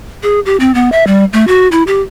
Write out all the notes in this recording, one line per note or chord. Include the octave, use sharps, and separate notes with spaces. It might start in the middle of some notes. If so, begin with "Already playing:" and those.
G#4
G4
C4
B3
E5
G3
A3
F#4
E4
G4